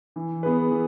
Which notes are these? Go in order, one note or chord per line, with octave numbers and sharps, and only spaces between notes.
E3
B3 G#4 B4
E3